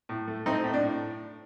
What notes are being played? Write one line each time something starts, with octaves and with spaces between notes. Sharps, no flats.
A2
A3
A3 C4 D#4
A2
D4
A2